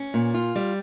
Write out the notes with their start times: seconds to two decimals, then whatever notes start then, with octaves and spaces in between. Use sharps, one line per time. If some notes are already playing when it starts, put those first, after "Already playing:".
Already playing: C#4
0.14 A#2
0.34 F4
0.56 G3